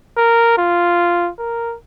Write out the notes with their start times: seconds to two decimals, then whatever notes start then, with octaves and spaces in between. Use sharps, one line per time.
0.18 A#4
0.58 F4
1.39 A#4